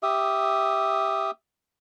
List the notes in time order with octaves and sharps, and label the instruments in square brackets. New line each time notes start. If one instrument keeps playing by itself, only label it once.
[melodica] G4 E5 D#6